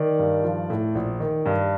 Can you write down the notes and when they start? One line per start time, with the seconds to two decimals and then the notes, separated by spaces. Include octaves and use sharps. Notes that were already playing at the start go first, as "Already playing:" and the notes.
Already playing: D#3 D5
0.19 G2
0.44 F3
0.70 A2
0.95 A#1
1.20 D#3
1.46 G2